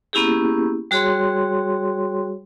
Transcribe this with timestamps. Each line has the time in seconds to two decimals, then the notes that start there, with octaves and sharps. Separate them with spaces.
0.13 A#3 B3 C#4 E4 G4 G#4
0.91 G3 F#4 G#4 C#5 C6